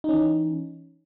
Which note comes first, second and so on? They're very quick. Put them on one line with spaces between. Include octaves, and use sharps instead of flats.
D#4 C#4 E3